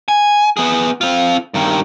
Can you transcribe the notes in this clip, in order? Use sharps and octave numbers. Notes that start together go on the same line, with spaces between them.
G#5
B3 G#4
C4 F4
G2 D#3